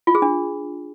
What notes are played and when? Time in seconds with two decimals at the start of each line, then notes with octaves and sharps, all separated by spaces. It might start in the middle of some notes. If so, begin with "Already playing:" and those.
0.07 F4
0.15 G#4
0.22 D4